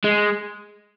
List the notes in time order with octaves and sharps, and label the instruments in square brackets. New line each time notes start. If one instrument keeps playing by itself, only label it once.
[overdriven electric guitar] G#3